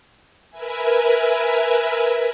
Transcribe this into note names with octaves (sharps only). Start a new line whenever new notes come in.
A#4 B4 E5 G#5